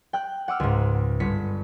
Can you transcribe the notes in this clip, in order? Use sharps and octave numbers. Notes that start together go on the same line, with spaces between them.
G5 F#6
F#5 D6 E6 F6
C#2 G#2
G1 B6 C#7